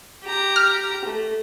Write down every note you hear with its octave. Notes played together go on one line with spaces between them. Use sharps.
G4 A#5
F6
A3